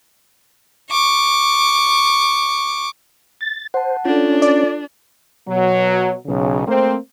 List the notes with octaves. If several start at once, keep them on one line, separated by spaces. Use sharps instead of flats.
C#6 D6
A6
C5 F#5 A5
C#4 D4 F4 A4
D5
B2 F#3
B1 C#3
A3 A#3 C4